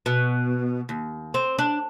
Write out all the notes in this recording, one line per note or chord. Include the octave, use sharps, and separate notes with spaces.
B2
D#2
C4
D4